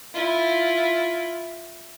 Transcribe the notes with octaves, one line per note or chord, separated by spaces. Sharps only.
E4 F4